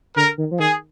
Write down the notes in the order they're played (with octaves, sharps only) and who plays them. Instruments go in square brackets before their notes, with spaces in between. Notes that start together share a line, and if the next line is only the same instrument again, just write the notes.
[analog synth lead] D3 [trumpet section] A#4
[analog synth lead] D#3
F3
[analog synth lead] D#3 [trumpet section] G#4